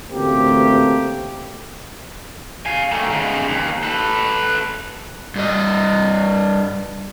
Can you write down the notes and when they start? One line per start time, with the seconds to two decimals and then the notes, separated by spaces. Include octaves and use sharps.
0.11 A1 D2 A3 A#3 C4 G4
2.66 F5 G#5
2.92 D#3 A3
3.10 G#2 C#3
3.48 D#2
3.83 A4 B4
5.36 G2 D#5